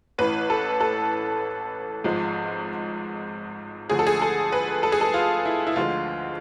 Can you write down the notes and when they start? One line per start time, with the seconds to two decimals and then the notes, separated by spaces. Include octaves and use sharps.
0.18 A1 A2 E3 B4
0.50 A4
0.81 A4
2.04 G#1 G#2 F3
3.90 D2 D3 F3 G#4
3.99 A4
4.07 G#4
4.22 A4
4.52 B4
4.83 A4
4.92 G#4
5.01 A4
5.14 F4
5.45 E4
5.67 E4
5.76 D2 D3 F3 G#3 F4